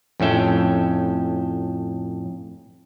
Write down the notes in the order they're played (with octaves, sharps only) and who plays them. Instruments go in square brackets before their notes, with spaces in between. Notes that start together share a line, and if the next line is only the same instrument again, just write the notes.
[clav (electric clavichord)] F2 A2 C#4 E5 G5